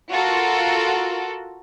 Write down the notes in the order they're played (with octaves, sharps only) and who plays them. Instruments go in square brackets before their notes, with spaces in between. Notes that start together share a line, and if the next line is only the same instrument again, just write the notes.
[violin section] F4 F#4 A4 A#4